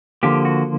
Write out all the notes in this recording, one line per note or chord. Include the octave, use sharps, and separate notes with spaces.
D3 F3 A#3 G4
F#4